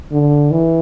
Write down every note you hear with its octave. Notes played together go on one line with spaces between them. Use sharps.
D3
E3